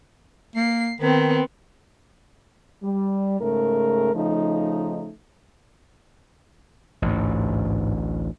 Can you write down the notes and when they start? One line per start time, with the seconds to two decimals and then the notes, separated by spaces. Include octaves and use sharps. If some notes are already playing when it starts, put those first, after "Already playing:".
0.56 A#3 C7
1.01 D#3 B3 C4
2.83 G3
3.40 G#2 C#3 A3 A#4
4.15 C#3 F3 A3 D#4
7.02 A1 D2 G#2